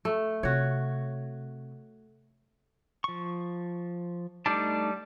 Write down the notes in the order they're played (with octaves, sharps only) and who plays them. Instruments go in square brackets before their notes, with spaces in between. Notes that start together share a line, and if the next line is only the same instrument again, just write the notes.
[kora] A3
[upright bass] C3 [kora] F#4 C#5
[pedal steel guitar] F3 C#6
[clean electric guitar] G3 D4 [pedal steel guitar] A3 D#4 A5